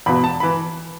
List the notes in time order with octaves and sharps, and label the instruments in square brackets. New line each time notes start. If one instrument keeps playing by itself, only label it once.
[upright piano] E2 B2 B5
A5
E3 B5